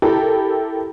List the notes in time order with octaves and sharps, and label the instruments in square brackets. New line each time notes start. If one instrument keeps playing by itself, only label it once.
[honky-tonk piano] E4 G4 A4 A#4